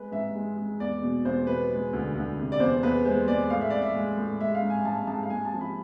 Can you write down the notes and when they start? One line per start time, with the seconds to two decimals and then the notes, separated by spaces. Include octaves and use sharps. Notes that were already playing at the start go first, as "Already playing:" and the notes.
Already playing: G#3 B4
0.12 G#2 E5
0.35 G#3
0.57 G#3
0.80 E2 D5
1.03 B2
1.25 E2 C5
1.47 B2 B4
1.70 G#3
1.93 D2
2.15 D2
2.38 C3
2.52 D5
2.60 E2 C5
2.83 E2 B4
3.05 G#3 C5
3.27 G#3 D5
3.50 A2 F5
3.61 E5
3.70 A2 D5
3.82 E5
3.95 G#3
4.17 A2
4.40 G#3 E5
4.55 F5
4.62 G#2
4.70 G#5
4.85 G#2 A5
5.07 G#2 A5
5.23 F5
5.30 G#3 G#5
5.45 A5
5.53 F3
5.61 B5